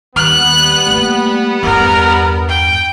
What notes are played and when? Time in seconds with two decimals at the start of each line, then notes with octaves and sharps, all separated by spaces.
0.16 D#2 G3 B3 F#6
0.87 A3 A#3
1.63 E2 G2 A#4
2.49 G5